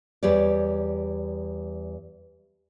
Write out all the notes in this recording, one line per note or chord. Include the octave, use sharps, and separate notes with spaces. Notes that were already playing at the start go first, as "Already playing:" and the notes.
E2 G3 C#5 D5